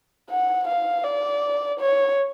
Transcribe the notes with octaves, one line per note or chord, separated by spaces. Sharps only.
F#5
F5
D5
C#5